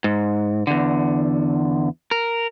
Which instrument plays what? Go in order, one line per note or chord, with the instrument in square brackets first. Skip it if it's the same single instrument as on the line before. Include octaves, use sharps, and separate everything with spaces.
[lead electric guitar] G#2
E2 D3
A#4